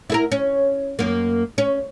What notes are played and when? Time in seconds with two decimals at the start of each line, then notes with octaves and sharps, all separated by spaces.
0.10 E4 A4 A#4
0.32 C#4
0.99 F#2 A#3
1.58 C#4